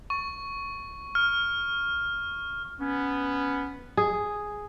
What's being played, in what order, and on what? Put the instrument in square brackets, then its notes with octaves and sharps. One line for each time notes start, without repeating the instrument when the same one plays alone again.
[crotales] C#6
F6
[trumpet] B3 [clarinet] C#4
[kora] G#4